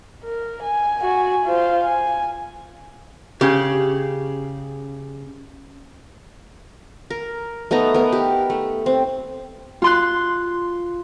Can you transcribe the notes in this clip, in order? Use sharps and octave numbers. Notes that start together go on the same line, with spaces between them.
A#4
G#5
F#4 G#5
F4 C5
G#5
C#3 G4 G#4
A#4
A3 B3 D#4 A#5
B3 A#4
G4
A3
C4
F4 C6 F#6